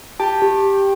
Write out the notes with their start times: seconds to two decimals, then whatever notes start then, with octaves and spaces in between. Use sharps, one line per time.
0.20 G4 A5
0.42 G4